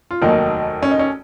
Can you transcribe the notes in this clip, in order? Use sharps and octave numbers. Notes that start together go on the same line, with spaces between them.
F4
F1 D#2 D#3 F#3 A#3 D#4
C#4
D#4
C#4